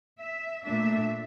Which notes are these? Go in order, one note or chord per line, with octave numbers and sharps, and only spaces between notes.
E5
A#2 A3 D4 E5